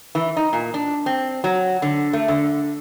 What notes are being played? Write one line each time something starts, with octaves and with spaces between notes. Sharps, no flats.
E3
D#4
A#2
D4
C4
F#3
D3
A3
D3